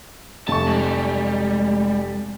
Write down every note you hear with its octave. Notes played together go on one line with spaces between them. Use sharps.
F1 A5 C#6
G3 G#3